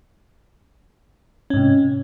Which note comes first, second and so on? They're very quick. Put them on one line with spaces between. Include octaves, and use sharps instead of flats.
C#4 G#2 C3